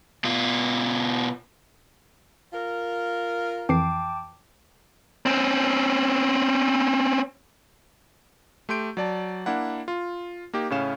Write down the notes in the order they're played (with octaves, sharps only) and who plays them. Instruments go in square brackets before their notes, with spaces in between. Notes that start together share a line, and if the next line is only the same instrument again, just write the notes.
[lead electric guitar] B2 F4
[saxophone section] F4 A#4
[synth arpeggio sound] F2 E3 C7 [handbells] G5 A5 D6
[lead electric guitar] C4 C#4
[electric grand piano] A3 G4 C6 G6 D7
F#3 D5 A5
A#3 D4 E4 F#5
F4
A#3 D#4 G4
A2 C#3 C#4 F5 E7